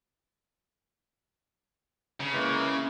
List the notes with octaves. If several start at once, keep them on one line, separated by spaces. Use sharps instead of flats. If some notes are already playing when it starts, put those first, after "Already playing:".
C#3
E3 G#3 A#3